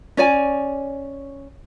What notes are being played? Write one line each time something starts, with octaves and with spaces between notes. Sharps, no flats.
C#4 C#5 D5 G#5